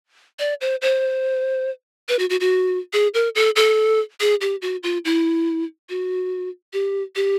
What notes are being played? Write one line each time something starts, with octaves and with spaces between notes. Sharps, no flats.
D5
C5
C5
B4
F#4
F#4
F#4
G#4
A#4
A4
A4
G#4
G4
F#4
F4
E4
F#4
G4
G4